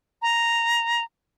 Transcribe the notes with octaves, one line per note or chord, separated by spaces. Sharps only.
A#5